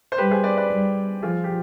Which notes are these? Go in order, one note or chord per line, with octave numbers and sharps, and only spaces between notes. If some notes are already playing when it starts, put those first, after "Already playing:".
C5
G3 G4 B4
G#4 C5
B4 D5
B4 D5
G3
F3 F4 G#4
G4